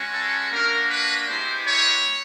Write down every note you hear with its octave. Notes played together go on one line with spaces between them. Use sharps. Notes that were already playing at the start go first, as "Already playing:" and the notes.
Already playing: G#3 C#4 F#4
A4
A#3 D4 F#4 A#4
B4
G#3 B3 E4 G4 C5
C#5